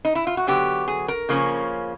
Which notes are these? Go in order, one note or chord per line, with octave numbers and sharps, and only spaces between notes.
D#4
E4
F4
F#4
D3 F#3 B3 G4
G#4
A#4
C#3 F3 A#3 C#4